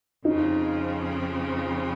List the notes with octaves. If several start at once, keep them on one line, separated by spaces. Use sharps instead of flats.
F2 C#3 F3 C4 D#4